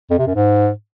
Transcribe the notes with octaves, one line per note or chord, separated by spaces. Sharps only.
F2
C3
F#2
G#2